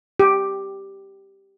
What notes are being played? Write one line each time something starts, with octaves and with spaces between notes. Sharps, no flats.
G4